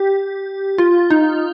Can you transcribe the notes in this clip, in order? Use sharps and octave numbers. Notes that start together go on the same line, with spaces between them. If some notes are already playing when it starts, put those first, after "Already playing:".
Already playing: G4
F4
D#4